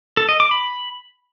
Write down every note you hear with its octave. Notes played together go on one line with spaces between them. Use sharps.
A4
D#5
D6
B5